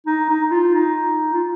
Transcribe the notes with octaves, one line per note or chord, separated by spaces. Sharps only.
D#4
D#4
F4
D#4
F4